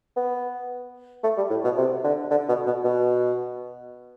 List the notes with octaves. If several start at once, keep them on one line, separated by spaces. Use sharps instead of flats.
B3
A3
G3
A2
B2
C3
D3
D3
B2
B2
B2